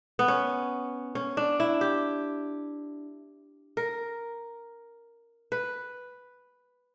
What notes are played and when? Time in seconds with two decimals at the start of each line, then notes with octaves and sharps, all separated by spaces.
0.19 B3
0.28 C#4
1.15 C#4
1.37 D4
1.60 E4
1.81 G4
3.77 A#4
5.52 B4